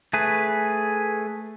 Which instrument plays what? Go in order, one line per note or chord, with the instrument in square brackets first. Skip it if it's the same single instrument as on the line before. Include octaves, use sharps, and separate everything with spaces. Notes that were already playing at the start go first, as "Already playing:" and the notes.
[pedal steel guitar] A3 G#4 B4